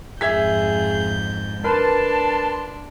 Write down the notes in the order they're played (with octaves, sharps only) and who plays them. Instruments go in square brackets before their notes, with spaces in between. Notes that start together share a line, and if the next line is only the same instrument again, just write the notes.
[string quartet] F2 G#2 G6 [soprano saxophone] G#4 [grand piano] E5 G#6 B6
[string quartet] D4 [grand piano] A#4 B4 [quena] A5 [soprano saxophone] C6